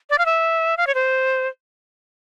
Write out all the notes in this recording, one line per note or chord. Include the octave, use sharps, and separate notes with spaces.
D5
F5
E5
F5
C#5
C5